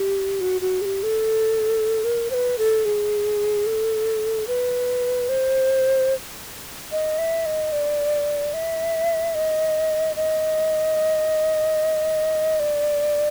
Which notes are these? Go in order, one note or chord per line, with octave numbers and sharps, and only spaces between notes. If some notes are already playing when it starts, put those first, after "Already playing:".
Already playing: G4
F#4
F#4
G#4
G4
A4
A#4
C5
B4
A4
G#4
A4
B4
C5
D#5
E5
D#5
D5
E5
D#5
D#5
D5